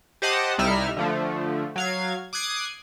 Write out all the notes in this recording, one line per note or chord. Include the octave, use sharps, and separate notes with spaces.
G4 C5 D#5 F#5 A5 D#6
C2 G3 D#4 E4 E5 F6
D3 F3 A3
F#3 F5 G#6
D6 D#6 F#6 G#6 C7